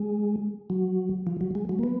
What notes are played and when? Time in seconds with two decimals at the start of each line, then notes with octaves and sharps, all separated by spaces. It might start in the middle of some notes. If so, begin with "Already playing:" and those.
Already playing: G#3
0.70 F#3
1.27 F3
1.41 F#3
1.55 G#3
1.69 F#3
1.79 A#3
1.83 B3